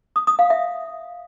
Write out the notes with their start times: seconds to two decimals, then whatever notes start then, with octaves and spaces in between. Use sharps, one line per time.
0.16 D#6
0.27 D#6
0.39 F5
0.50 E5